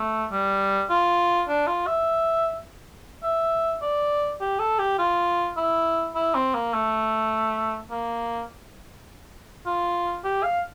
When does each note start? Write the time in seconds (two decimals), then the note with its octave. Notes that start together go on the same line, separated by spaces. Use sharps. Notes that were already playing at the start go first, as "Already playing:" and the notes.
Already playing: A3
0.31 G3
0.90 F4
1.48 D4
1.67 F4
1.87 E5
3.23 E5
3.82 D5
4.41 G4
4.59 A4
4.79 G4
4.99 F4
5.57 E4
6.15 E4
6.35 C4
6.54 A#3
6.74 A3
7.91 A#3
9.66 F4
10.24 G4
10.43 F5